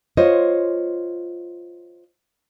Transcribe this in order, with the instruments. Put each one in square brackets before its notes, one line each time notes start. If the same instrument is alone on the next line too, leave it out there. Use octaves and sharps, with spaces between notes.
[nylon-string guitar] F4 C5 C#5 D#5